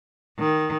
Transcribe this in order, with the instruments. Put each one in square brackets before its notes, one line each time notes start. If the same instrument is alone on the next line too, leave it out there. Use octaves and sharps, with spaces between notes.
[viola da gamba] D#3